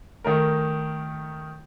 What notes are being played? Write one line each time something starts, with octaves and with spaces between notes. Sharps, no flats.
D#3 A3 A#4